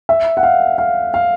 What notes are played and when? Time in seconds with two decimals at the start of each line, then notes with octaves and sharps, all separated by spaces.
0.09 E5
0.37 F#5
0.43 F5
0.78 F5
1.14 F5